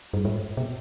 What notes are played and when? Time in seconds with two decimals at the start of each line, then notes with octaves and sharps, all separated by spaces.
0.13 G2
0.25 G#2
0.57 B2